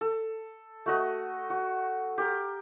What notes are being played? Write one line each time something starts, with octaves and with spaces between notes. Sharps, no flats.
A4
A3 F#4 D#5
F#4
G4 A#4